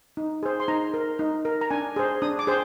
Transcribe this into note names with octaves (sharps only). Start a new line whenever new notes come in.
D#4
G#4 C5
C6
D#4 A#5
A#4
D#4
A#4
A#5
D4 G#5
G#4 C5
D4 D#6
D6
G#4 C5